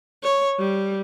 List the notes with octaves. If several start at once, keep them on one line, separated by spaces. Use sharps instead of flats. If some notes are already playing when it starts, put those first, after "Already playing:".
C#5
G3